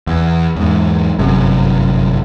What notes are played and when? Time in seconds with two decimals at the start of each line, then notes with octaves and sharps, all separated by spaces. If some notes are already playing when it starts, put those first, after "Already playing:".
0.07 E2
0.56 E2 G#2
1.18 G1 F#2 C3